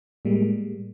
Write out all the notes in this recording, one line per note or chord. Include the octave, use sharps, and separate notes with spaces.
A2 G3 G#3 A#3